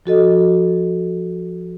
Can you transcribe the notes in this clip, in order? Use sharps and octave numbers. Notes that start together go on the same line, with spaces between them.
F3 F#4 A4 D#5